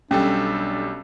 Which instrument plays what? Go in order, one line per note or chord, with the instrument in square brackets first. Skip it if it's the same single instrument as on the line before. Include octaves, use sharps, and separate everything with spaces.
[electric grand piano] B1 G3 A4 [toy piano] C#4 [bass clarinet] D4